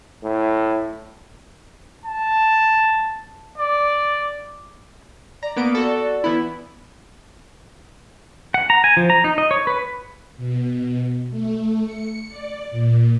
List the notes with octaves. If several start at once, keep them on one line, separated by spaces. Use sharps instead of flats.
A2
A5
D5
D5 A#5
A#3 B3 D7
F#4 A4
E3 B3 E4
F#5
A#5
G#5
F3
A#5
D#4
D#5
C#5
B4
B2
A3
C#7
D5
A#2